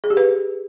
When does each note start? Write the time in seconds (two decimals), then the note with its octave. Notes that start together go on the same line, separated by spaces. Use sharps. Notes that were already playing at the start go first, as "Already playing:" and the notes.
0.04 G#4
0.10 G4
0.17 B4